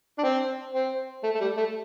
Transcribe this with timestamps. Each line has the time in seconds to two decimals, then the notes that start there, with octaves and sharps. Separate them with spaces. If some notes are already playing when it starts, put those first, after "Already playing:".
0.18 D4
0.23 C4
0.73 C4
1.23 A3
1.35 A3
1.41 G3
1.57 A3